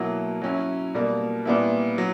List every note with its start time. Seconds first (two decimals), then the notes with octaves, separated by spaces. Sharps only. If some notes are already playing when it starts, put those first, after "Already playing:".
Already playing: B2 F#3 A#3 E4
0.42 F#3 C#4 E4
0.94 B2 G3 A#3
1.45 A#2 G3 B3 E4
1.98 F#3